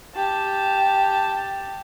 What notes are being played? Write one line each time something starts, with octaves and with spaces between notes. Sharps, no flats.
G4 A5